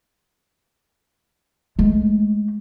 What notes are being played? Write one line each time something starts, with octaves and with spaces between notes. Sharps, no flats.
G#3 A3